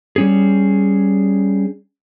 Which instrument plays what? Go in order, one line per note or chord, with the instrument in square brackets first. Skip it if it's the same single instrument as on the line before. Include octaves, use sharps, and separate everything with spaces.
[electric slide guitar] G3 C#4 G#4